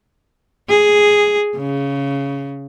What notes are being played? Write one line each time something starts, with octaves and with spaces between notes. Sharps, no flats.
G#4
C#3